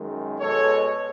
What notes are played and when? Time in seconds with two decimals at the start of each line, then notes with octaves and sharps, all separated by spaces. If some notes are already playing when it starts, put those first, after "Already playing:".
Already playing: F#2 D#3 G#3
0.39 B2 G#3 A4 C#5